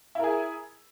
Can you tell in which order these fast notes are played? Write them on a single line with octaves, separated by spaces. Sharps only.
E4 A#4 G#4